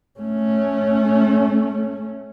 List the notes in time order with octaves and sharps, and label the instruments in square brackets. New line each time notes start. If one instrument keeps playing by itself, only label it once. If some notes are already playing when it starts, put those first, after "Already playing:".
[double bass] A3 C#4